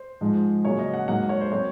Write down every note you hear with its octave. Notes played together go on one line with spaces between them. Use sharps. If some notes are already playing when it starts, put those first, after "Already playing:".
Already playing: C5
G#2 F3 G#3
C#3 F#3 A#3 C#5
D#5
F#5
G#2 F#3 A#3 F#5
C#5
C5
F#3 C4 C#5